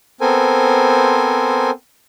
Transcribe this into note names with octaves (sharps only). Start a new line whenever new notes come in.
B3 C4 A4 A#4 C5 G#5